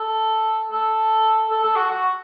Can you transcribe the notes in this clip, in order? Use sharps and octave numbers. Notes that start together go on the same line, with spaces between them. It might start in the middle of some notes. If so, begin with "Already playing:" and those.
Already playing: A4
A4
A4
A4
F#4
F#4